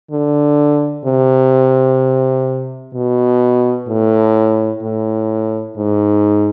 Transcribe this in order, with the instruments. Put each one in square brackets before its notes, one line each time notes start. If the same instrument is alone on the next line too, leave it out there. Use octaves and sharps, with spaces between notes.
[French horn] D3
C3
B2
A2
A2
G#2